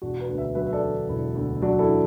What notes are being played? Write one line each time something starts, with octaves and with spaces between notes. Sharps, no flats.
E1 D4 F#4
F#4 B4
D2
B4 E5
F#3 B4 E5
E5
A4 D5
D3
E1 E4
D2
F#3 D4 F#4
E4 A4
D3